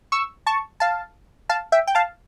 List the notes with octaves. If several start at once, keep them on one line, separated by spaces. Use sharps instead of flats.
C#6 E6
A5 C#6
F5 A5
F5 A5
E5 G5
G5
F5 A5